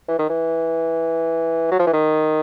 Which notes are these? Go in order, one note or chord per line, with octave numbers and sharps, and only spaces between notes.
E3
D#3
E3
F#3
F3
E3
D#3